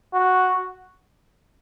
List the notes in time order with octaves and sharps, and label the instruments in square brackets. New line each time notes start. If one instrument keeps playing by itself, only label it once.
[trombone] F#4